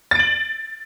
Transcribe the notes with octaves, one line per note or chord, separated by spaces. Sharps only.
A6 D7 F#7